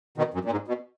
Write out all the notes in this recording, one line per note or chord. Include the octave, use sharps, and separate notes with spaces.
B2 D#3
F#2
A#2
G#2
B2